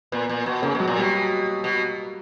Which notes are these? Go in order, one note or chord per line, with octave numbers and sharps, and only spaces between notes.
A#2 B3
A#2
B2
C#3 A#3
B2
F#3
A#2
G3
B2
B2